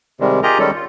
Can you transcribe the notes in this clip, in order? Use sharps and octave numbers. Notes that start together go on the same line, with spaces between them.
C3 D#3 G3 G#3
F4 G4 G#4 A#4 D#5 A#5
D#3 G3 G#3 C#4 A4
F4